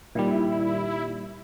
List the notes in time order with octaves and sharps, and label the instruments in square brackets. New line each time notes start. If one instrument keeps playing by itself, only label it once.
[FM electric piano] A#2 D#3 G3 [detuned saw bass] E4